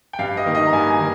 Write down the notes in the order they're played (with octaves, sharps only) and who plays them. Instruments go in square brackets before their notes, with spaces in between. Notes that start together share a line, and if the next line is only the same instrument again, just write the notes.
[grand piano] G5
G2 F5
D#5
D#3 A#3 D#4
D#5
A#5
G2 G#5
G#5
D#3